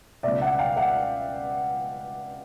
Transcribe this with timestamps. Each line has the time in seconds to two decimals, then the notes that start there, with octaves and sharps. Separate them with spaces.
0.23 C#2 B2 D5 E5
0.41 E5 F#5
0.59 F5 G5
0.76 E5 F#5